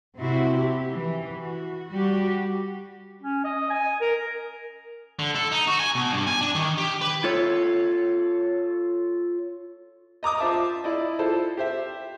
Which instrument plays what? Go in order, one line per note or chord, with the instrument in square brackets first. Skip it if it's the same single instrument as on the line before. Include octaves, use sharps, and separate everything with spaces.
[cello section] C3 C4 E4 F#4
G4
E3
F#4
G3 F#4 G4
[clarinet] C#4
D#5
G#5
A#4
[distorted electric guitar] D3
A4
D#4
F#4
G#5
B2
G2
G#5
D4
D#3
G4
B4
[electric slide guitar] F4 A4 C#5
[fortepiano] D#5 A#5 D6 D#6
F4 C5 E5 A5 D6
E4 D5 D#5
E4 F4 A4 C5
G4 C5 E5